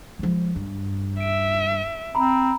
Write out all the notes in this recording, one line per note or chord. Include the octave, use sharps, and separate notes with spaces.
F3 G#3
G2
E5 D7
C4 A#5 B5